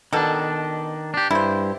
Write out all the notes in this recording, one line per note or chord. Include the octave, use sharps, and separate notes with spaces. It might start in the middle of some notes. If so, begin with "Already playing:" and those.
B2 D#3 D4 A4
D4 G4
G2 E4 C5